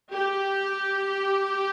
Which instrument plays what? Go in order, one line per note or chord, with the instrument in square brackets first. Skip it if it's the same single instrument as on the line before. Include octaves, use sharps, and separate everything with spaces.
[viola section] G4